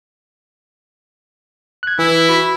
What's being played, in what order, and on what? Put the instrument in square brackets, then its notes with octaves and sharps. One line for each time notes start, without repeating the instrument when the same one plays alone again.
[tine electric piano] F#6 G#6
[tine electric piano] E3 [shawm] E4
[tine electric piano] F#4 [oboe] B5